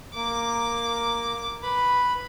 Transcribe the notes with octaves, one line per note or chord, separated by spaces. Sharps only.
A#3 D6
B4 B5